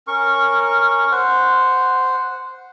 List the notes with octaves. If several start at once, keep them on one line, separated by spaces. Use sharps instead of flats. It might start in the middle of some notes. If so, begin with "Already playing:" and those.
C#4 A#4 C#6
C5 F#5